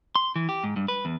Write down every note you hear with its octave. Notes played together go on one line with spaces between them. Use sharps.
C6
E3
G4
G#2
G2
B4
E2